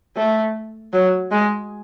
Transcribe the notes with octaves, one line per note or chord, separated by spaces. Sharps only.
A3
F#3
G#3